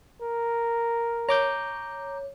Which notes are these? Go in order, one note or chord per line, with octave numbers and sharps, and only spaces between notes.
A#4
C#5 A#5 D6 G6